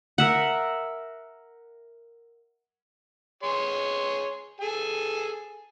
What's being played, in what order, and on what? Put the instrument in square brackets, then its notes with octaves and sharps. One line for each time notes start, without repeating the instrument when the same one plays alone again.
[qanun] A#4 E5 F#5
[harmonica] G#4 C#5 C6
G#4 A4 G#5